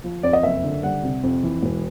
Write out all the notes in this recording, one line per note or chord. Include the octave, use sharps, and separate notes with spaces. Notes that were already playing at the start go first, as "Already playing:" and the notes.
F3
F2 D5
D#5
F#1 E5
D3
G3 F#5
C3
F2
E3
E1